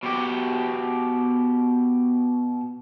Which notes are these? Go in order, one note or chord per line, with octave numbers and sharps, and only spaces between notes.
B2 G4